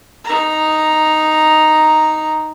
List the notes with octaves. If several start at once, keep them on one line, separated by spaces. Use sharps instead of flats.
D#4 A#5